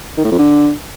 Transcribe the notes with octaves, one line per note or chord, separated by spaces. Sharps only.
D#3
A2
F2
D3